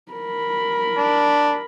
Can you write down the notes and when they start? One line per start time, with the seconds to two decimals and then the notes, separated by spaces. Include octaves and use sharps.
0.12 A#4 B5
0.98 D4